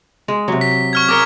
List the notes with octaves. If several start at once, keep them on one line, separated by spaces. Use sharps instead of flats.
G#3
C3 F#3
B6
C#6 F6 G#6
G#4 A#4 C#5 D6 F6